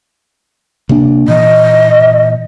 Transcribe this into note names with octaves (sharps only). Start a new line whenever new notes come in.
C3 A#3 D4
A#2 E3 D#5